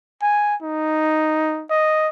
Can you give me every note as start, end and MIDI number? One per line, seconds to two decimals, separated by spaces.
0.22 0.55 80
0.62 1.65 63
1.70 2.09 75